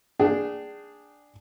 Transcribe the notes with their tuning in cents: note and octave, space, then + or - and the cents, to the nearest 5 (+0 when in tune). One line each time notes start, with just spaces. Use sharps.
D4 +0 G#4 -10 G5 -35